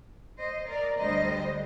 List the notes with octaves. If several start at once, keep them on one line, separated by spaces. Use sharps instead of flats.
C5 D#5
A#4 D5
D2 D3 G3 C5 D#5